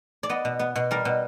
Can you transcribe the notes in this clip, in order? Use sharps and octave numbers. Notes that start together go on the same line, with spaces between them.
D5
B3 D#5
B2
B3
B2
G3 A#4
B2